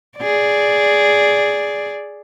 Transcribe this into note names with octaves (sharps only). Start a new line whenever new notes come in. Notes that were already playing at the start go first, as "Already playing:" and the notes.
G#4 D5